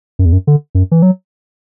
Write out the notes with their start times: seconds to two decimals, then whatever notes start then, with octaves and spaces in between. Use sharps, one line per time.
0.19 F#2
0.25 E2
0.33 F#2
0.47 D3
0.75 F#2
0.92 E3
1.02 F#3